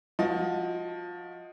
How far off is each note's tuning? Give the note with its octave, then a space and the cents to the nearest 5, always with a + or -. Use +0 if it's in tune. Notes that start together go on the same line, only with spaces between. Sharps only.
F3 +15 F#4 +0 D#5 +15